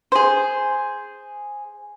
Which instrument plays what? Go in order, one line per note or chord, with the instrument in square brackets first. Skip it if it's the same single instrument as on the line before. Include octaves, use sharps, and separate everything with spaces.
[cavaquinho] G#4 C5